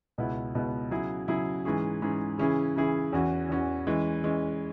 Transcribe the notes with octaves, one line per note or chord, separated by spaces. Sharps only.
C#2 B2 B3 E4
C#2 B2 B3 E4
C#3 F#3 E4 G#4
C#3 F#3 E4 G#4
G#2 E3 C#4 G#4
G#2 E3 C#4 G#4
C#3 E3 C#4 E4 G#4
C#3 E3 C#4 E4 G#4
E2 E3 C#4 F#4
E2 E3 C#4 F#4
E3 G#3 C#4
E3 G#3 C#4